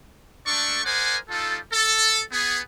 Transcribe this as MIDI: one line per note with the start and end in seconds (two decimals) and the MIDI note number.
0.47 0.81 56
0.47 0.81 57
0.47 0.81 62
0.47 0.81 69
0.47 0.81 74
0.47 0.81 85
0.84 1.17 68
0.84 1.17 70
0.84 1.17 72
0.84 1.17 74
0.84 1.17 78
0.84 1.17 80
1.29 1.58 55
1.29 1.58 63
1.29 1.58 65
1.29 1.58 69
1.73 2.21 69
2.31 2.59 59
2.31 2.59 68